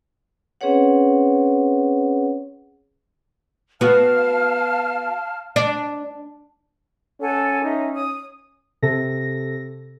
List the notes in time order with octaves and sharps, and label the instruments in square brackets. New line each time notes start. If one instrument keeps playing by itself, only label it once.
[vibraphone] C4 C#4 G#4 B4 C#5 F#5
[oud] B3 F#4 [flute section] F5 A5 F6
[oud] D4
[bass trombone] C#4 [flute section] A4 F#5 G#5
[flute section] D#4 E5
D#6
[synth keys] C3 A4 A#6